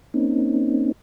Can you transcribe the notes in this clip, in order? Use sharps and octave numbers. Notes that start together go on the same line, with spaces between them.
A#3 C4 C#4 D#4